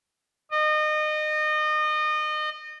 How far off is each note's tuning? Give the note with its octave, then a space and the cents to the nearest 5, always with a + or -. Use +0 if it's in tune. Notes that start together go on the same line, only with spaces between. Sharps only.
D#5 -30